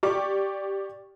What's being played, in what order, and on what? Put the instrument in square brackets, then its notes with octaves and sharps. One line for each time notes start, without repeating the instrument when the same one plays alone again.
[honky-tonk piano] G4 D5 G5 C#6 D6